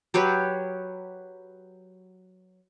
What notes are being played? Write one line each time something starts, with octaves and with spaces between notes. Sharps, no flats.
F#3 G4 B4 C#5